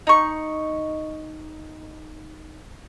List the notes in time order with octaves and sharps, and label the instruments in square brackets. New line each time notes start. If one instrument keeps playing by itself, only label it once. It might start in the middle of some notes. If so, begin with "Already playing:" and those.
[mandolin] D#4 C#6